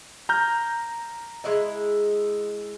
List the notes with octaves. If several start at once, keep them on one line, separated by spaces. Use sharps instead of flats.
A#5 F6 G6
G#3 E4 D#5